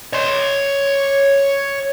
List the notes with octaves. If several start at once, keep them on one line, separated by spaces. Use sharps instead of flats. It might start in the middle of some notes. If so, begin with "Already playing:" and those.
C#5 C6